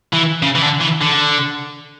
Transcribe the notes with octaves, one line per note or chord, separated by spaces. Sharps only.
E3
C#3
E3
D3
E3
D3